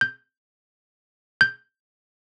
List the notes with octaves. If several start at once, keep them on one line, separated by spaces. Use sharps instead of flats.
G6
G6